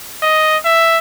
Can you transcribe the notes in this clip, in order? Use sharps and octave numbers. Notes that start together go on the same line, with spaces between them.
D#5
E5